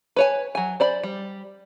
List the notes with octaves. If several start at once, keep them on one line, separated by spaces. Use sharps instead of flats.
B4 C#5 G#5
F#3 G#5
C5 D5 B5
G3